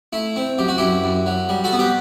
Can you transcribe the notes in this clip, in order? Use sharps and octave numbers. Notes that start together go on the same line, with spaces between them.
A3 E4
C4
F#2 G4
F#4
F#2 E4 G4
F#2
F#3
G3
F#4 A4
B3
G4 B4